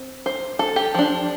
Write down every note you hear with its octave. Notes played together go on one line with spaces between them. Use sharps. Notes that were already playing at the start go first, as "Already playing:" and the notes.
Already playing: C4
C5
A4
G4
F3 D4